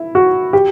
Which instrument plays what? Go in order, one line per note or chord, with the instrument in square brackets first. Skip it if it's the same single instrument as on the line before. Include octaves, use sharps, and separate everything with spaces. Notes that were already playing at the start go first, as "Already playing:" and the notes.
Already playing: [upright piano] E4
F#4
G4